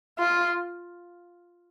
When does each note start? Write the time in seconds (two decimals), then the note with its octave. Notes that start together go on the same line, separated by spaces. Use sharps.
0.19 F4